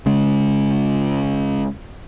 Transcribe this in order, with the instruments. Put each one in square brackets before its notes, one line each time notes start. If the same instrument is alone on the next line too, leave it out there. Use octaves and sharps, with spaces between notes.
[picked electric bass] C#3 G#3